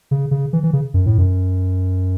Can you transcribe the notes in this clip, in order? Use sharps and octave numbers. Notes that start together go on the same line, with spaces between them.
C#3
C#3
E3
E3
C#3
F#2
A2
F#2